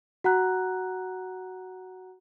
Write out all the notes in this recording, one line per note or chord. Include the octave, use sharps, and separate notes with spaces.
F#4 F#5 A#5 F#6